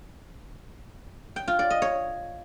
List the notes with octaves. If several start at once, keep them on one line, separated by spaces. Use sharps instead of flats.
G5
F4
D5
D#5
C#5